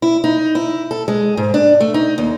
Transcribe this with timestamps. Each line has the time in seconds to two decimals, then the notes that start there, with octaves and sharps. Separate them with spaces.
0.02 E4
0.24 D#4
0.55 E4
0.91 A4
1.08 G#3
1.37 G#2
1.54 D4
1.80 A3
1.94 D#4
2.18 D#2